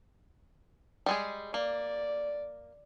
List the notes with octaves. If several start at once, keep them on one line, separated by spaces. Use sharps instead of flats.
G3 G#3 G#4
A#3 D5